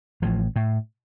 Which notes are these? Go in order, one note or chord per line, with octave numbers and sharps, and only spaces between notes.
A1 A2 F3
A2